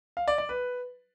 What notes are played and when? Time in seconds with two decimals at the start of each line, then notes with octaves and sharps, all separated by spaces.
0.17 F5
0.28 D5
0.38 D5
0.49 B4